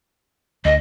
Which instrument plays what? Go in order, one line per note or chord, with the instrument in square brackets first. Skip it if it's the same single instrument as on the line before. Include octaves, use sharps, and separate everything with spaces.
[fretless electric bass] D2 [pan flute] D#5